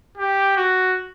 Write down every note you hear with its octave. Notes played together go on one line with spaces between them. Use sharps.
G4
F#4